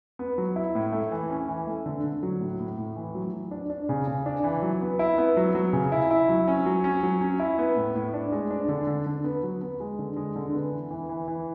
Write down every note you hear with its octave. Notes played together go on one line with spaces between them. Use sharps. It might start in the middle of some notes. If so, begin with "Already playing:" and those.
B3
F#3
E4
A2
A3
E3
C#4
E3
A3
D3
D3
F#3
A2
A2
A2
E3
F#3
F#3
D4
D4
C#3
C#3
D4
E3
F#3
B3
E4
B3
F#3
F#3
C#3
E4
E4
F#3
C#4
F#3
C#4
F#3
C#4
E4
B3
A2
A2
D4
G#3
D4
D3
D3
D3
B3
F#3
B3
G#3
D3
G#3
D3
B3
E3
E3
E3
E3